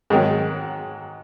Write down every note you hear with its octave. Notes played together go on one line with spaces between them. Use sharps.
G#2 D#3 F#3